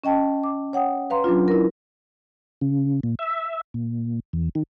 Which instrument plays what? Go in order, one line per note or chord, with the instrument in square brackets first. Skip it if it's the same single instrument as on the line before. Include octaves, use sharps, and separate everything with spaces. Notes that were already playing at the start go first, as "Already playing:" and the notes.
[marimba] C#4 D#5 G5 A5
D6
C#5 F#5 G5 D#6
B4 F5 A#5 C6
F#3 C#4 D4 F4
E4 A#4
[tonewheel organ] C#3
A#2
E5
A#2
E2
D#3